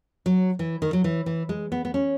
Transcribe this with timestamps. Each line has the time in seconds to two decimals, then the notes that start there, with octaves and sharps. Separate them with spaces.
0.26 F#3
0.59 E3
0.82 D#3
0.93 F#3
1.04 E3
1.26 E3
1.49 G#3
1.72 B3
1.85 B3
1.94 C#4